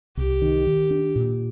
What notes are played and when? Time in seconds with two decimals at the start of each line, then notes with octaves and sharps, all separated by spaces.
0.17 C2 G4
0.42 D#3
0.67 D#3
0.91 D4
1.16 A#2